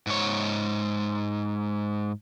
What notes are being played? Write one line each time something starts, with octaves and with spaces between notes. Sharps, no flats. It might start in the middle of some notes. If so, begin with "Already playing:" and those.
G#2 C#5